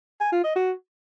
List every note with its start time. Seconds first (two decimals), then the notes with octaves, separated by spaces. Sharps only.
0.21 G#5
0.32 F4
0.44 D#5
0.56 F#4